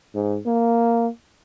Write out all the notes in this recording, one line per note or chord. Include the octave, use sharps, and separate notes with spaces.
G#2
A#3